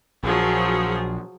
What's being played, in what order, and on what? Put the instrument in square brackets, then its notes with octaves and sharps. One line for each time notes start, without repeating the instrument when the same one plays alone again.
[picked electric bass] A#1 [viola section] F3 F#3 G#4